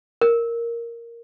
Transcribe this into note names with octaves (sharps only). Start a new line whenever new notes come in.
A#4